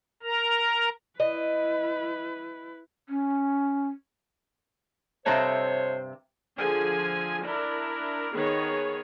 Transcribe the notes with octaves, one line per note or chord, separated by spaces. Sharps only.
A#4 A#5
E4 B4 D#5
C#4
G2 C3 A4 C5 C#5 D#5 E5 A#5
D3 F3 G#4 G#5
D4 E4 A#4
D#3 B3 G#4 C#5